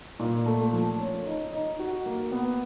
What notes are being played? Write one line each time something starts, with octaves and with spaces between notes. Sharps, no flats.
A#2
A3
F3
C#4
D#4
D#4
F#4
A#3
B3